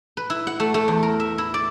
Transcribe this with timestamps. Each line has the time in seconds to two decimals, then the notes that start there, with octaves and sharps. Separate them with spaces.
0.17 B4
0.30 E4
0.47 F#5
0.60 A3
0.74 A3
0.88 E2
1.03 A#4
1.20 E5
1.38 E4
1.54 D5